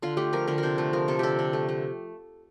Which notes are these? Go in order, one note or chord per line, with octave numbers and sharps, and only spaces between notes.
D3 F4
A3 G4
F3 A#4
D3 A#4
A#4
C3 C5
A3 C5
F3 A#4
C3 A4
D3 G4 A4
D3
A3
A3